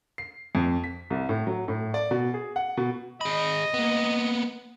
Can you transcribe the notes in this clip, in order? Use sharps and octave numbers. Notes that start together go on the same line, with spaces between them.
C7
F2
B6
C2
A2
F#3
A2
D5
B2
G#4
F#5
B2
G#4 D#5 B5
A#3 B3